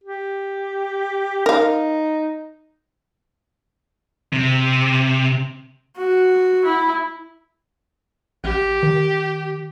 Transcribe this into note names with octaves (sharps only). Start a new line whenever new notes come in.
G4
D#4 A#4 F5
C3
F#4
E4
A1 G4
D#3